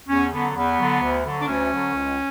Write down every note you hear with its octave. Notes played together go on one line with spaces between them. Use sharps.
E2 C#4
D3 F#3 B3
E2 B3
D3 F#3
D2
D3 F#3
D4
D2 C#4
D3 F#3
C#2